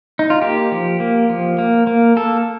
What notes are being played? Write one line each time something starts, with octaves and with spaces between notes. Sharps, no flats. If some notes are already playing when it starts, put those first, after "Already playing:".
D#4
F4
A#3 G4
F3
A#3
F3
A#3
A#3
A#3 A4